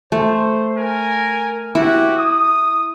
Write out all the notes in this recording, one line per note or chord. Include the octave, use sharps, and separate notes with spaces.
A3 C5
A#4 G#5
B3 E4 F#4 G4
D#6